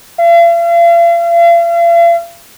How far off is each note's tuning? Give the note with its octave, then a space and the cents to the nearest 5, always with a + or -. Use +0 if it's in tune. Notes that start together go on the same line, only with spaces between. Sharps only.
F5 -45